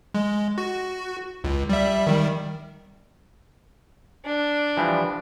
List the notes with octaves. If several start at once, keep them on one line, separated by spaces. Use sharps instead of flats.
G#3
F#4
C#2
G3 E5
D#3 G3
D4
E3 F3 G3